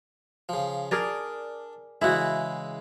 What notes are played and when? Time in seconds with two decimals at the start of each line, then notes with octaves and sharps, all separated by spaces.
0.49 C#3 F3
0.91 D4 G#4 A#4 D5
2.01 C#3 E3 G#3 E4 F#4